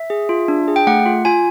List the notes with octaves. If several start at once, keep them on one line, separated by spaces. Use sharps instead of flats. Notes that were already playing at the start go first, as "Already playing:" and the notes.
Already playing: E5
G#4
F4
D4
G#4
G5
A3 F#5
F4
F4 G#5